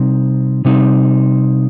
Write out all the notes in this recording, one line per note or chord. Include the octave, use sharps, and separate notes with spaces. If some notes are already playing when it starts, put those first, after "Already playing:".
Already playing: C3 G3 C4 D#4
C3 G3 C4 D#4